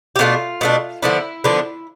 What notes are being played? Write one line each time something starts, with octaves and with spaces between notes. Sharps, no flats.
G4
B2 A3 D4 F4
B2 A3 D4
D3 F3 B3 D4 E4
D3 F3 B3 D4